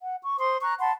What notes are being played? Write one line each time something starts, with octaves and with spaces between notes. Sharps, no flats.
F#5
C#6
C5 C6 D#6
A#5 C#6 F#6
F#5 A5 B5 C6